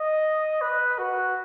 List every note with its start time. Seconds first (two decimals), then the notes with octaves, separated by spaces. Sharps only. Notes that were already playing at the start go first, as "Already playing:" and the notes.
Already playing: D#5
0.61 B4
0.98 F#4